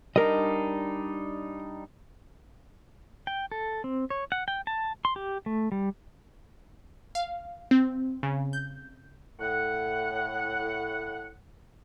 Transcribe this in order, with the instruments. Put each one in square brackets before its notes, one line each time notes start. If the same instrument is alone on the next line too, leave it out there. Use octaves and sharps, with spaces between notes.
[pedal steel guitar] G3 D4 D#4 [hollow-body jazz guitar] A#4 D#5
[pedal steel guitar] G5
A4
C4
C#5
F#5
G5
A5
C6
G4
A3
G3
[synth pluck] F5
C4
C#3
G6
[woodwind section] A2 F#5